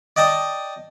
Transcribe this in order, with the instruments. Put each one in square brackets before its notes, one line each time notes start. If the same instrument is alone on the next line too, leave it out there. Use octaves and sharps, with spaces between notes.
[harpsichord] D5 D#5 G5 A5 D#6